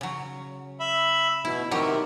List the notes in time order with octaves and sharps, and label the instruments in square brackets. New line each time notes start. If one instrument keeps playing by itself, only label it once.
[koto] C#3 F#3
[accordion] E5 B5
[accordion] B2 [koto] E4
[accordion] C3 D#3 [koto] F#3 G4